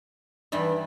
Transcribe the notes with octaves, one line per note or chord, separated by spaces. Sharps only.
G2 D#3 E3 D5